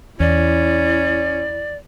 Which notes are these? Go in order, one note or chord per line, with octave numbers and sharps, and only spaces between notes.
E2 C#4 E4 D5